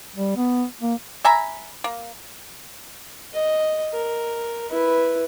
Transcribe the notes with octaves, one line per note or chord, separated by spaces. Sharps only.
G3
B3
A#3
E5 G#5 A#5 B5
A#3
D#5
A#4
E4 B4